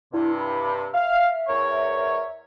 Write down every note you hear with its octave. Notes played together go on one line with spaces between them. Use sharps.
G2 C3 E4
B5
E5 F5
E2 A#4 C#5